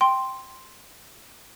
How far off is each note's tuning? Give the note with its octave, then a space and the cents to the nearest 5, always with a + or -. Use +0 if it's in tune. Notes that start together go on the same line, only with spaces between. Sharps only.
G5 +0 C6 +0